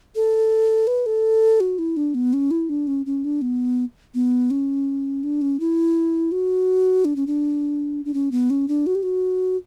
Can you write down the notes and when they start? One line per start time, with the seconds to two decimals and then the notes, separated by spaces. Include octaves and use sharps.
0.15 A4
0.87 B4
1.06 A4
1.60 F#4
1.79 E4
1.97 D4
2.15 B3
2.33 C#4
2.51 E4
2.69 D4
2.87 C#4
3.06 C#4
3.24 D4
3.42 B3
4.14 B3
4.51 C#4
5.23 D4
5.42 C#4
5.60 E4
6.32 F#4
7.05 D4
7.16 C#4
7.27 D4
8.05 D4
8.14 C#4
8.32 B3
8.50 C#4
8.68 D4
8.86 F#4
8.95 G4
9.03 F#4